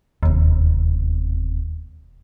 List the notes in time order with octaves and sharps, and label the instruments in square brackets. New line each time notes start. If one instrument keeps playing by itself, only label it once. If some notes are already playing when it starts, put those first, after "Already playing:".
[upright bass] E1 C3 [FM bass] D#2